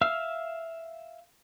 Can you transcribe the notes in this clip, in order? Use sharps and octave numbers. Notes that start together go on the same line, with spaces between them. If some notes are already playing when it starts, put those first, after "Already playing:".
E5 F5 E6 F6